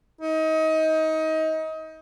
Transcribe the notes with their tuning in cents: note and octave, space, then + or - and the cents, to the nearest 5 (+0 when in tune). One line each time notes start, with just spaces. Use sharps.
D#4 +30